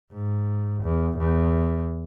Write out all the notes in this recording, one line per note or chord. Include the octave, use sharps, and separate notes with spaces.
G#2
E2
E2